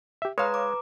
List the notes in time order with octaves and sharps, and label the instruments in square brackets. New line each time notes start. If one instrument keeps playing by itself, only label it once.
[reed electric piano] G4 E5
[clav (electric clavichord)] G#3 [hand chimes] B4 A#5 [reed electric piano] C#5 F5
[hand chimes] D6